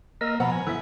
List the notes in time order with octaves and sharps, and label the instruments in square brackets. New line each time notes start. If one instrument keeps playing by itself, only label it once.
[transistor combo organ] A#3 [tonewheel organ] A#4 D#5 E6
[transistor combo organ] B2 [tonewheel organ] F3 B3 [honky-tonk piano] F#5 A#5 B5
[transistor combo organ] G#5
[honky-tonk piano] E3 E4 B6 [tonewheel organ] A4